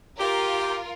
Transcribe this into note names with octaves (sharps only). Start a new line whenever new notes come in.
F4 G4 A#4